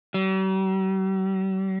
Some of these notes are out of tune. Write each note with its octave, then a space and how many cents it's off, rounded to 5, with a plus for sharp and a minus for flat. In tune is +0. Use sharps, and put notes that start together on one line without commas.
G3 -45